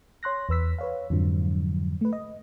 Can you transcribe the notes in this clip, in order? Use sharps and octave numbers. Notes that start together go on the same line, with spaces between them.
C#5 C6 F#6 A#6
E2 B4 E6 B6
B4 C#5 F5
F2 G#2 D3 F3 F#3
A3 B4
D#5